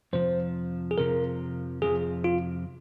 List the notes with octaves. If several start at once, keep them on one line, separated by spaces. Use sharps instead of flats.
F2 C3 F3 C5
G#4
F2 C3 F3 A#4
F2 C3 F3 G#4
F4